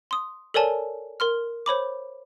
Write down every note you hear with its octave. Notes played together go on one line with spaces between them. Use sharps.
C6 D#6
A4 A#4 C#5 D5 G#5 A5
A#4 C6 F6
C5 C#5 B5 D6